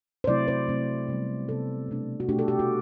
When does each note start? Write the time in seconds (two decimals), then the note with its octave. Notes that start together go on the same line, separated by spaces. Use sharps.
0.24 C5
0.27 C3 F#3 A3 C4 E4 D5
0.48 C5
0.68 C3 F#3 A3 C4 E4
1.08 C3 G3 B3
1.49 C3 G3 B3 A4
1.88 B2 A3 D4
2.20 F#4
2.29 B2 A3 D4 G4
2.39 A4
2.48 G4
2.59 F#4